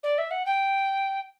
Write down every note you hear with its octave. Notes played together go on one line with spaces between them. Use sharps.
D5
E5
F#5
G5